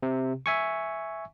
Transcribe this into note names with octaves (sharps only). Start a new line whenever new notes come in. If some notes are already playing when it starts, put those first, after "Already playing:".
C3
E5 G#5 C#6